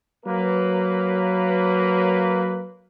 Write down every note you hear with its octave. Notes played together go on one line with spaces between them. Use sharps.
F#3 A#3 B4